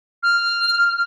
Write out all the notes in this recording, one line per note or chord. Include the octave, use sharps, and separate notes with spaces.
F6